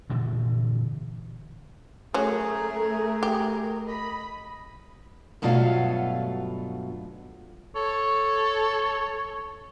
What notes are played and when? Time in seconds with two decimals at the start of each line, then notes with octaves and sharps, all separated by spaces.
0.10 G2 A#2 D3 E3
2.14 F#3 A3 C#4 G#4 A#4
3.23 G4
3.87 D#5 B5
5.42 G2 B2 F#3 A3 F4 F5
7.76 A4 C#5